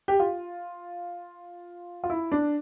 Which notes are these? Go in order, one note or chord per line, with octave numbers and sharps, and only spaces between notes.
G4
F4
F4
E4
D4